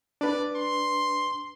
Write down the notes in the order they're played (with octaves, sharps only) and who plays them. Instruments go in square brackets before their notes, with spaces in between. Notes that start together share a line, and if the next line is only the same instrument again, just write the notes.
[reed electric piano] D4 B4 [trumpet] D5
[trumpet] C6